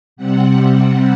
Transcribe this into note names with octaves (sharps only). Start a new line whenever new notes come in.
C3 G3 C4 F#5
F#5